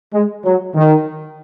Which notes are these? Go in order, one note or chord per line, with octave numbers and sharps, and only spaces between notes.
G#3
F#3
D#3